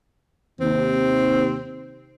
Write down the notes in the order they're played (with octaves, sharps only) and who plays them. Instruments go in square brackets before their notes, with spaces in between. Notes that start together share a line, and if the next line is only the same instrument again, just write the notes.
[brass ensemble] D#2 C3 [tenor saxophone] C4